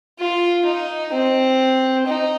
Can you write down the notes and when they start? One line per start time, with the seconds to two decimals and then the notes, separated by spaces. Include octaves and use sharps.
0.19 F4
0.66 D#4
1.12 C4
2.07 D#4